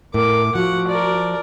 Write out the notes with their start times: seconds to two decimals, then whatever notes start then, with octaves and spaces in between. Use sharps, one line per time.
0.14 A2 A#4 D6
0.55 F3 F#4 F#5
0.88 A#4 D5